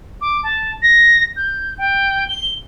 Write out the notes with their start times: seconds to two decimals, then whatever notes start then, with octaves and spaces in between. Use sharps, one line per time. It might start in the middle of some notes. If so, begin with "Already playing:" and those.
0.21 D6
0.43 A5
0.82 A#6
1.37 G6
1.78 G5
2.28 G7